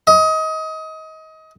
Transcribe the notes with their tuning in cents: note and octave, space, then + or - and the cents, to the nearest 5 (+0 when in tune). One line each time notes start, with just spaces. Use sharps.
D#5 +25